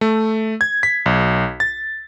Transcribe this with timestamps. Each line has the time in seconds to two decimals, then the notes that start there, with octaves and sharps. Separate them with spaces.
0.01 A3
0.61 G#6
0.83 B6
1.06 B1
1.60 A6